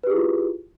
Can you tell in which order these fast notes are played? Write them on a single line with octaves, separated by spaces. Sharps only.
B4 G4 G#4 E4 F4